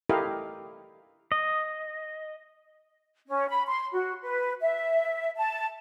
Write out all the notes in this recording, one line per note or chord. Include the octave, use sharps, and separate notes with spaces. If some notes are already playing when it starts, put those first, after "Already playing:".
E4 G4 A4 A#4 D#5 F5
D#5
C#4
B5
C6
F#4
B4
E5
A5